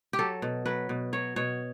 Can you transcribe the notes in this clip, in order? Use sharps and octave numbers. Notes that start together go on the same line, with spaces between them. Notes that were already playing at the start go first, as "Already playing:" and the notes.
G4
F#3 A4
B2
F#3 B4
B2
F#3 C#5
B2 C#5